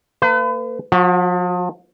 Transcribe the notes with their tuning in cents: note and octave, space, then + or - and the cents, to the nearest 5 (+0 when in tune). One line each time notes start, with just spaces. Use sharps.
A#3 -30 B4 +40
F3 +40 F#4 -5